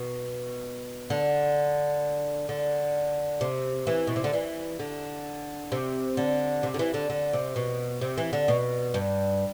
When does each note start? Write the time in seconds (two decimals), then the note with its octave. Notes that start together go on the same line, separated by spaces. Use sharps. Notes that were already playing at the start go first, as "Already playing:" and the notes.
Already playing: B2
1.10 D3
2.49 D3
3.41 C3
3.87 E3
4.07 B2
4.16 C3
4.24 D3
4.33 E3
4.79 D3
5.72 C3
6.17 D3
6.63 C3
6.74 D3
6.79 E3
6.94 D3
7.10 D3
7.33 C3
7.56 B2
8.01 C3
8.18 E3
8.33 D3
8.48 B2
8.94 G2